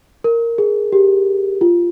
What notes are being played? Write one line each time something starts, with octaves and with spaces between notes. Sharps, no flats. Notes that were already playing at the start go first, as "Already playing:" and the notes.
A#4
G#4
G4
F4